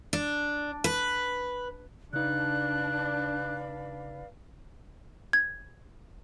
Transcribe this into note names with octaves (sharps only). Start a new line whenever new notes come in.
D4
B4
C#3 D4 D#4 B4 D5 F5 F#6
G#6